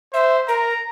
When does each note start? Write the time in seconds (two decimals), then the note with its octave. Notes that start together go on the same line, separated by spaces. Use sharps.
0.14 C5 E5
0.48 A#4 A#5